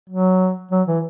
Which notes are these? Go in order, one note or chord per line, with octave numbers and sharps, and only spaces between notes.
F#3
F#3
E3